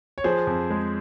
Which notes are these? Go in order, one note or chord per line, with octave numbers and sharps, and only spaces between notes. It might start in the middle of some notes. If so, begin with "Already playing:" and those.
C#5
F3 G#4 C5
F2
G#3